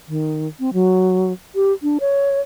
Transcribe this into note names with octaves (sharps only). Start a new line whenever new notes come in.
D#3
C4
F#3
G4
D4
C#5